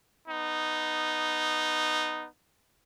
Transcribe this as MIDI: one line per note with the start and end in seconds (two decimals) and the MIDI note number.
0.27 2.25 59
0.27 2.25 63